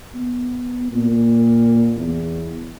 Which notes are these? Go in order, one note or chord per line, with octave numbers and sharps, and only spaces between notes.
B3
A#2
E2